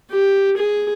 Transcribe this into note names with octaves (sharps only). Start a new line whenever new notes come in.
G4
G#4